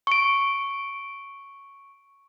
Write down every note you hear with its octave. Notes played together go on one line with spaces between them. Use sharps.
C#6 D7